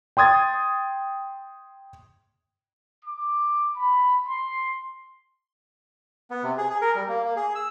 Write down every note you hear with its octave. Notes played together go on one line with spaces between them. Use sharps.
G5 C6 D#6 G#6 A6
D6
B5
C6
B3
C3
G#4
G#4
A#4
G3
A#3
A#3
G#4
E6